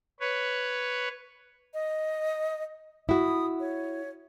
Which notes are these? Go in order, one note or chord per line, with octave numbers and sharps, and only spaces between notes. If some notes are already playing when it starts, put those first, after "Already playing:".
B4 C#5
D#5
E4 F#4 D#6
C#5